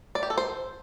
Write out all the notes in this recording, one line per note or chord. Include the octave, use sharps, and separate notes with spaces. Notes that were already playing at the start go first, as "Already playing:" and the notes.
D5
G4
A4
C5